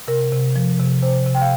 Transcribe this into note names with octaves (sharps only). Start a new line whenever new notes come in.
C3 A#4
C3
F3
C3
C3 C5
C3
G5
F5